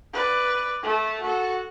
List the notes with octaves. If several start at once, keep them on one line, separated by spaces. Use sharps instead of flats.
B4 D5
A3 A4
F#4 A4